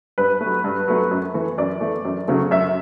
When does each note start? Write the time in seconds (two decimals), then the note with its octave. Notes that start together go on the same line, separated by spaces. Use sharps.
0.18 G2 B4
0.41 F#3 A3
0.64 G2
0.88 F#3 A3
1.11 F#2
1.34 E3 A3
1.58 F#2 D5
1.81 E3 A3
2.05 F#2
2.28 C#3 F#3 A3
2.51 F#2 E5